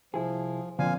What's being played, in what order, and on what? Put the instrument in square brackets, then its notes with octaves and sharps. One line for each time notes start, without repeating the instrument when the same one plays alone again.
[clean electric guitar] C2 E4 G#4 [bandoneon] F3
[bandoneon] A#2 F5 G#5 [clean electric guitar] D3 F3 C4